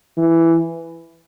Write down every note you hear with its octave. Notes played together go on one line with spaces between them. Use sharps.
E3